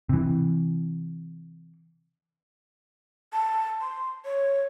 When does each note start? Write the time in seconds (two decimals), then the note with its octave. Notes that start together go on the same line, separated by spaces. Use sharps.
0.09 C3 E3
3.33 A5
3.81 C6
4.25 C#5